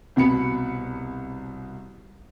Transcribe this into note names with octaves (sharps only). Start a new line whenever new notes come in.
C2 B2 B5 C#7